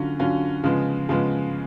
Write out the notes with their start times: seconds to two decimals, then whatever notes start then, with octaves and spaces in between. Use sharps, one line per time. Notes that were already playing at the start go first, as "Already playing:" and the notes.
Already playing: D3 F#3 C#4 F4
0.19 D3 F#3 C#4 F4
0.64 C#3 F3 G#3 B3
1.09 C#3 F3 G#3 B3